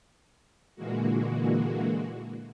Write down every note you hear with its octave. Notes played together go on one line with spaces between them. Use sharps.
A#2 D3 E3 G#3 A#3 F#4